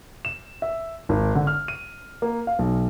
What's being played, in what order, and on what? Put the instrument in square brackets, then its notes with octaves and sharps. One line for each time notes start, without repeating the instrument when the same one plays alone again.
[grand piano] E7
E5
G#1
D3
F6
D#7
A#3
F5
B1